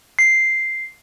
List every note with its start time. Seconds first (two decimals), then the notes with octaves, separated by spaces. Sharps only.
0.19 C7